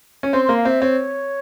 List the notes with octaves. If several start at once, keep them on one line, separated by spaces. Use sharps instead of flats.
C#4
C4 C6
A#3 C6
F5
C4 E5
C4 C#5